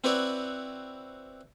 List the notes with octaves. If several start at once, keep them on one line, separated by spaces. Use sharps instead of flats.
C4 E4 F#4 B4 C#5 D5